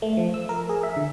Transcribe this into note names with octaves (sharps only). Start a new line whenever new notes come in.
A3
F3
E6
A#4
G#4
E5
D3